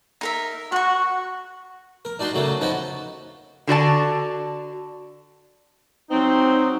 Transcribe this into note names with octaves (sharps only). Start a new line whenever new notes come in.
D#4 A#4 E5
F#4 F#5 C#6
A#4
D4 D#4 F#4 C6
C#3 F#3 A3 A#3
F3 B3 C#4 D#4 F#4
D3 F#4 D5 A5
F#3 C4 D#4